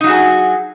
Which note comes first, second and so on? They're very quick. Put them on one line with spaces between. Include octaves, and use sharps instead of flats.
D#4 F#3 F#4 G#4